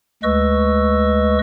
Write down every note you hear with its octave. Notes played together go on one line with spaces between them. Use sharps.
D2 G#3 B4 D#5 C#6 E6